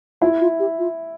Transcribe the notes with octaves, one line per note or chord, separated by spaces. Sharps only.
E4 F4
F4
G4
F4